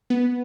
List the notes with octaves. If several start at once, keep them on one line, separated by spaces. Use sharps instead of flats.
B3